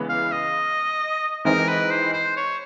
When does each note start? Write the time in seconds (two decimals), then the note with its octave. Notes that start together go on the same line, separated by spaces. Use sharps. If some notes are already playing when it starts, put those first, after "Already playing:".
Already playing: C#3 E3 G#3 B3
0.09 F5
0.32 D#5
1.45 E3 G#3 C4 D#4 A#4
1.69 B4
1.91 C5
2.13 C5
2.37 C#5